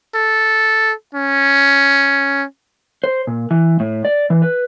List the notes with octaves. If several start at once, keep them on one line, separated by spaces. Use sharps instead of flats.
A4
C#4
C5
A#2
E3
A2
D5
E3
B4